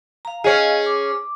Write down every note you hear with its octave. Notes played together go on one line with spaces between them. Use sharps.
F5 A#5
C#4 G#4 D#5 F5
D6